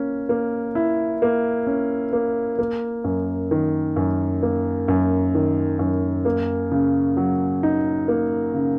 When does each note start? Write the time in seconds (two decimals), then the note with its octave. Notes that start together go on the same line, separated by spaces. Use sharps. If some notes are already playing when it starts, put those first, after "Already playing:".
Already playing: A#3 C#4
0.29 A#3
0.75 E4
1.22 A#3
1.67 C#4
2.13 A#3
2.59 A#3
3.04 F#2
3.51 D#3
3.96 F#2
4.43 A#3
4.88 F#2
5.34 D#3
5.79 F#2
6.25 A#3
6.71 C#3
7.17 F#3
7.63 D#4
8.08 A#3
8.54 C#3